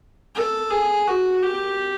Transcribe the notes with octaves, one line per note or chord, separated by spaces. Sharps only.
A4
G#4
F#4
G4